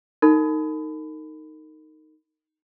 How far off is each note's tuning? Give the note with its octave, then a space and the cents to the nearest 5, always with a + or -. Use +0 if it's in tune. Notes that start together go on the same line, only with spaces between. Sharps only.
D#4 +0 A#4 -45 B5 +25